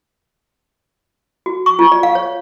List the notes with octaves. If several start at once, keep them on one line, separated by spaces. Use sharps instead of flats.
F#4
C#6
F4
D5
F5
C#5